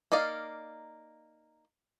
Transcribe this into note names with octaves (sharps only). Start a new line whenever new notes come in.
A#3 D#4 D5 F5